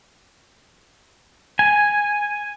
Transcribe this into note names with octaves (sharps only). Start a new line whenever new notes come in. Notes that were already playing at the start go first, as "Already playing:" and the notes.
G#5